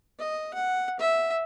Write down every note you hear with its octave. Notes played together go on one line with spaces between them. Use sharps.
D#5
F#5
E5